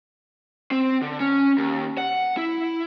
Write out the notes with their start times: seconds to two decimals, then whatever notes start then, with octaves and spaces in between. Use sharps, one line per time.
0.71 C4
1.02 D3
1.20 C#4
1.58 D#2
1.98 F#5
2.37 E4